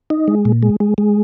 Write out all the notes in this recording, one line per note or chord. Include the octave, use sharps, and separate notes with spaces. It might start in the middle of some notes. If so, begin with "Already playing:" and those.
D#4
G#3
A#2
G#3
G#3
G#3